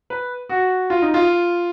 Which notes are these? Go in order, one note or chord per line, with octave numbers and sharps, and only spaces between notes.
B4
F#4
F4
D#4
F4